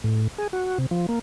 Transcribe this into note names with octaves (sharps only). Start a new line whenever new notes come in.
A2
G#4
F#4
C3
F3
A#3